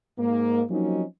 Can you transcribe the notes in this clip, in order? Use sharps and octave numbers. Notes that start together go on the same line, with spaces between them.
G#2 A#3
F3 F#3 A#3 C4 C#4 D#4